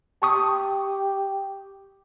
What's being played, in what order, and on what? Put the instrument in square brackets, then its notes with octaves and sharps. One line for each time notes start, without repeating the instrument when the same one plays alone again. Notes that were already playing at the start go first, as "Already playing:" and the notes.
[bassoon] G4 [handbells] A5 C#6 D#6